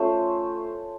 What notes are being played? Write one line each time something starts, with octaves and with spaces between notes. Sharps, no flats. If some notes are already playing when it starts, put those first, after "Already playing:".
Already playing: A3 C#4 F4 C5